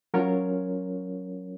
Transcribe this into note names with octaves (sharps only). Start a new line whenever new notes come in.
F#3 C#4 F4 A#4 C#5